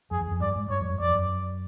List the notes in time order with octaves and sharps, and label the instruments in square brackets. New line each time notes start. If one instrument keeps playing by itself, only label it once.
[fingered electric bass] F2 [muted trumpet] G#4
[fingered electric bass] E2
F2
[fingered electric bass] G2 [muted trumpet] D5
[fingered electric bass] G#2
[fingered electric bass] G2 [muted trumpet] C#5
[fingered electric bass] F2
F#2
[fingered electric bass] F2 [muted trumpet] D5
[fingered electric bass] F#2